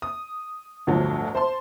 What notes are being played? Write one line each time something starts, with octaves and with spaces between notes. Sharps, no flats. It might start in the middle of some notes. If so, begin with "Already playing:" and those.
D#6
G1 D2 A2 F3 F#3
C5 A5 C6